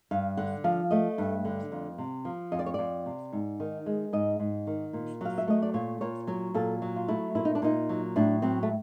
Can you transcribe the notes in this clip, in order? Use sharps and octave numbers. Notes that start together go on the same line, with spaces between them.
G2 F5
D3 F#5
F3 F5
A3 D#5
G2
D3
F2
C3
F3
F2 D#5
D5
C#5
F2 D5
C3
G#2
D#3
G#3
G#2 D#5
G#2
D#3
A#2
F#3 F5
E5
A3 D#5
D5
A#2 C#5
A#2 C#5
F#3 C#5
A#2 A4
F#3
F4
A3 E4
A#2 E4
D#4
D4
A#2 D#4
F#3
A2 D4
F#3 C4
A3